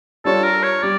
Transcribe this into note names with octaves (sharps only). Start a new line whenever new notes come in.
G3 D4 F4 A4 C#5
A#4
C#5
G3 D5